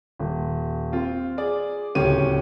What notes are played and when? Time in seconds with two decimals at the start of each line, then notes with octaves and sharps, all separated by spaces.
0.20 D#1
0.92 C4 F4
1.38 G#4 D5
1.95 D1 C#2 C#4 G4 D#7